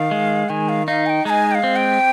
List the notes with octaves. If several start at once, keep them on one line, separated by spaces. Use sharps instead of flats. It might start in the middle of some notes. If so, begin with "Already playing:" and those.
Already playing: D#3 F5
G#3
D#3 G#5
F5
D#4 F5
G#5
G5
G#3 G#5 A#5
G5
F5
C4
G5